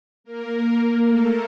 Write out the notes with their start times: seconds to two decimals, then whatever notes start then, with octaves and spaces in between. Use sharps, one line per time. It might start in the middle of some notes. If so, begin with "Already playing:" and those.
0.24 A#3 A#4
1.08 A3 A4